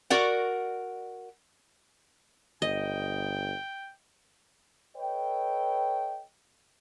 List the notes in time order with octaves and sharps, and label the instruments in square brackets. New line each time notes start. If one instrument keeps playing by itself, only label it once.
[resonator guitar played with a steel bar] F#4 A#4 D5 F#5
[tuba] G1 [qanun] D#5 [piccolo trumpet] G5
[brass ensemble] A4 B4 C#5 D#5 G5